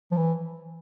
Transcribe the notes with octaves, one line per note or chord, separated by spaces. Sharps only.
F3
E3